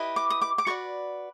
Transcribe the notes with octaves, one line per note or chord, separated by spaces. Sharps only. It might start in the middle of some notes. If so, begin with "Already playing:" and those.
Already playing: E4 G4 B4 D#5
D6
D#6
D6
D6
F#4 B4 D5 C#6